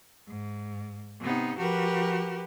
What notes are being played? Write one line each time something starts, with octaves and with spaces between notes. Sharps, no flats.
G#2
C3 B3 D#4
F3 F#4 G4 A#4 B4